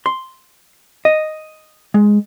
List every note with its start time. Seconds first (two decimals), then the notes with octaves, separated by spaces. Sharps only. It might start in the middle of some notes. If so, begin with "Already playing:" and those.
0.06 C6
1.05 D#5
1.94 G#3